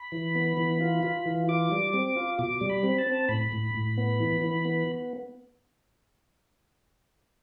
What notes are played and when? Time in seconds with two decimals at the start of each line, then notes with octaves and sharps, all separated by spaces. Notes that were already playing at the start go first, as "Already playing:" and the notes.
Already playing: B5
0.12 E3
0.35 B3
0.57 E3
0.81 F4
1.03 F4
1.26 E3
1.48 F4 D6
1.71 G3
1.94 C4
2.16 F4
2.39 B2 D6
2.61 G3
2.69 B5
2.83 C4
2.98 A5
3.07 C4
3.29 A2 B5
3.52 A2
3.75 A2
3.97 B3
4.20 E3
4.42 E3
4.65 B3